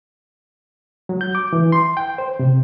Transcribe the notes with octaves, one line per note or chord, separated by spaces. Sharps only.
F#3
G6
D6
E3
C6
G5
C5
C3